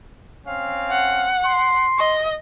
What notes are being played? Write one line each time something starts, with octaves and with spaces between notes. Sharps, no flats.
C4 C#4 F5
F#5
C6
D#5